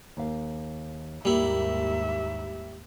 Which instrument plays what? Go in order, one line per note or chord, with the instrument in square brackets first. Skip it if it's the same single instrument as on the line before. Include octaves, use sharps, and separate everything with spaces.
[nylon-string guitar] D#2 F5
[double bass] D#2 G#2 [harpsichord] G3 E4 [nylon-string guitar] A#3 [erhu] E5